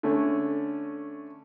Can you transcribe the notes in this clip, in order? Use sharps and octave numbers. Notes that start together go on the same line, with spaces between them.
D3 A3 C#4